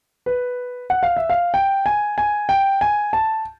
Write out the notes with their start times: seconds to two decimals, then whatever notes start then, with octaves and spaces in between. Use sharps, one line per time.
0.26 B4
0.90 F#5
1.03 F5
1.17 E5
1.30 F5
1.54 G5
1.86 G#5
2.18 G#5
2.49 G5
2.81 G#5
3.13 A5